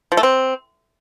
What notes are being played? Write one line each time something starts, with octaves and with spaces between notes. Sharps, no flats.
F3
A3
C4